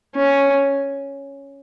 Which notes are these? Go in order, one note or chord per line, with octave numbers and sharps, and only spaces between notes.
C#4